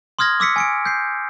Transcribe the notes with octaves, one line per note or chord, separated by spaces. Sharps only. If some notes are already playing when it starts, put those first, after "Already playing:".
C6 D#6 F6 G#6 A#6
D6 E6 B6 C#7
G#5 C#7 D7
G6 C7